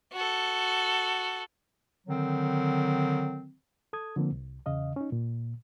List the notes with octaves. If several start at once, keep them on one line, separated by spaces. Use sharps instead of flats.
F#4 A4
D3 D#3 F#3 C4
A4 D#6 G#6
D3 F3 A#3 C4
C2
E2 C#3 D#5 F5
C#4 D#4
A#2